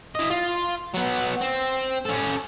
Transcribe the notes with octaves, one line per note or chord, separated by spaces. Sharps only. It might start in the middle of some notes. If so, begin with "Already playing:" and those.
E4 D#5
F4
F#3 B3
C4
C#4 A4